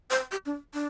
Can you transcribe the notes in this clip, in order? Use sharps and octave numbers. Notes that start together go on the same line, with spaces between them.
C5
G4
D4
D4